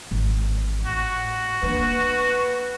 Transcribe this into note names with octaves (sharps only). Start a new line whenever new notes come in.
G#1 E3
A2 F#4
A#3 D4 B4